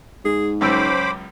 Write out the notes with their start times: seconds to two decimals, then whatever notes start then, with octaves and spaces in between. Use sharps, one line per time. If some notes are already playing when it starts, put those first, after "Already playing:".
0.25 G#2 G#4
0.61 C#2 F#2 C#4 C5 B5 D6 E6